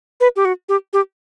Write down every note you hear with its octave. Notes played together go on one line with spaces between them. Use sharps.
B4
G4
F#4
G4
G4